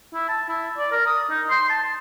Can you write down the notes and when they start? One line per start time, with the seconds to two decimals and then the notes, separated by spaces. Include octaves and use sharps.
0.14 E4
0.29 A5
0.49 E4
0.78 D5
0.91 A#4
1.06 D#6
1.30 D#4
1.50 C6
1.70 A5